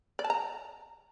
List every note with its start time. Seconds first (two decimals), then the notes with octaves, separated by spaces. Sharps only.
0.19 D5
0.24 A5
0.30 A#5